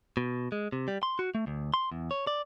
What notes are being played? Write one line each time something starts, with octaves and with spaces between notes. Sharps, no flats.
B2
G#3
C3
G3
C6
F#4
A3
D2
C6
E2
C#5
D5